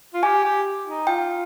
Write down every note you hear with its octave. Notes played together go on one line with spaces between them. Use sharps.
F4
G4 G#5
G4
D#4
F4 G5